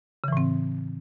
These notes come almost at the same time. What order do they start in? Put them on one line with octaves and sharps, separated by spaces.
C#3 E3 A2 C4